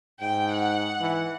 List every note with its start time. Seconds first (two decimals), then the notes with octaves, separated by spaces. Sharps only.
0.21 G#2 G5
0.53 F#5
1.00 E3